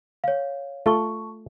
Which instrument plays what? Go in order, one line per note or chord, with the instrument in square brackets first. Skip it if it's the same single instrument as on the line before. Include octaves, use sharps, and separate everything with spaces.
[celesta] C#5 F5
[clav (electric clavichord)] A3 F4 A4 [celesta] A5 C#6